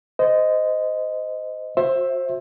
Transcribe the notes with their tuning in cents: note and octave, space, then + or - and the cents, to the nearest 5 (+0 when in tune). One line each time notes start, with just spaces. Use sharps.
C5 -25 D#5 +0
F#4 -30 C5 +20 E5 +0